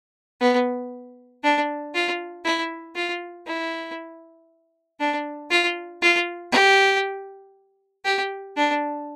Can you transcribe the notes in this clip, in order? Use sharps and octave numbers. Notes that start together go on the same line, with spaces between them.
B3
D4
F4
E4
F4
E4
D4
F4
F4
G4
G4
D4